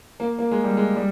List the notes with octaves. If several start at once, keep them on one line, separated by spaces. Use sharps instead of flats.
A#3
A#3
G#3
G3
G#3
G3